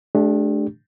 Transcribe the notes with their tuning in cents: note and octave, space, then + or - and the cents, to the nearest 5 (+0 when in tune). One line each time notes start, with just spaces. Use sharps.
A3 -35 D4 +0 G4 +0